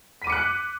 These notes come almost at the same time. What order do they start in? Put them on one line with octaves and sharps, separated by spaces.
B6 D#7 D6 C#7 F#6